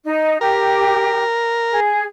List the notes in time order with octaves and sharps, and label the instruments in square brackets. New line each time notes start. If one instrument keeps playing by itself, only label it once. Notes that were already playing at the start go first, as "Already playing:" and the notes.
[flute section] D#4
[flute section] G4 [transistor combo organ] A#4
[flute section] G#4